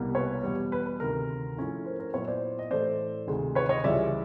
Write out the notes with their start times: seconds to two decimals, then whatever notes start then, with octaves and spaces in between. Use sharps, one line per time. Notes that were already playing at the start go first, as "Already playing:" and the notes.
Already playing: C2 B2 G3 A#3
0.15 B4 C#5
0.43 E2 B2 G3
0.72 B4
0.86 B4
1.00 D2 C3 D#3 A#4
1.57 G#2 F3 A3 C#4 E4
1.86 A#4 C5
2.00 A#4 C5
2.14 A#2 F#3 B3 E4 B4 C#5
2.28 C5 D5
2.59 D#5
2.70 A2 E3 A3 C5 D5
3.27 D2 C3 D#3 G#3
3.55 B4 C#5
3.69 C#5 D#5
3.84 C#2 C#3 E3 G3 D5 E5